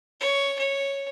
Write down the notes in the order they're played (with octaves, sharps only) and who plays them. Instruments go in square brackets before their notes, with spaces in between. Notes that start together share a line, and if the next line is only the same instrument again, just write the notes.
[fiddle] C#5
C#5